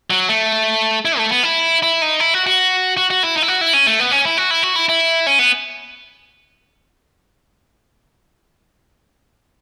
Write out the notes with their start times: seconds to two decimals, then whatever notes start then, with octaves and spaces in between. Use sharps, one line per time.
0.10 F#3
0.29 A3
1.05 E4
1.18 A3
1.31 B3
1.43 E4
1.83 E4
2.02 D#4
2.20 E4
2.34 F#4
2.47 F#4
2.97 F#4
3.10 F#4
3.23 E4
3.36 D#4
3.42 E4
3.48 F#4
3.61 E4
3.73 C#4
3.87 A3
4.00 B3
4.11 C#4
4.25 E4
4.38 F#4
4.51 E4
4.63 F#4
4.76 E4
4.89 E4
5.27 C#4
5.39 B3